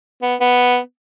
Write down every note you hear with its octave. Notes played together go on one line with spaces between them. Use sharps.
B3
B3